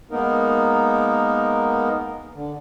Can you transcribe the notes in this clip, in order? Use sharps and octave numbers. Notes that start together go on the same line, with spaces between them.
G#3 A#3 B3 D#4 A#4
D3